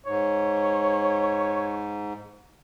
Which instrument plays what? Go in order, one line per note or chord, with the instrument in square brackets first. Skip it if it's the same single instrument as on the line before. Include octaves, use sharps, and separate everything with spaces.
[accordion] G#2 [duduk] C#5